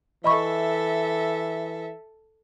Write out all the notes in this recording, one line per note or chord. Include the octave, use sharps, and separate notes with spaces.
E3 A4 D#5 E5 B5 C#6